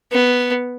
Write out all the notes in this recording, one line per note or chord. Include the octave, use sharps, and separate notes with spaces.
B3